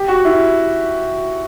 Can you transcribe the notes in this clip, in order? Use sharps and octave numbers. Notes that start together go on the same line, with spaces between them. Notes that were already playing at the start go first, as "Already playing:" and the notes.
Already playing: G4
F#4
E4